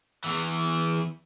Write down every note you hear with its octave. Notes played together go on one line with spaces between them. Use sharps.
E2 E3